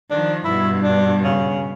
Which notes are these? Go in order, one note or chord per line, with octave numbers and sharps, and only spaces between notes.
D#3 F3 D4
G2 B2 E4
D4
C#3